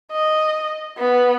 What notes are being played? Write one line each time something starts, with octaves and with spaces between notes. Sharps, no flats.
D#5
B3